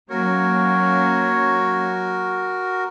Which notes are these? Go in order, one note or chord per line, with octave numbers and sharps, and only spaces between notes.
F#3 A#3 C#4 F#4 A#4 C#5